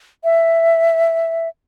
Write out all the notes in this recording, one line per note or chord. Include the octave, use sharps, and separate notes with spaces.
E5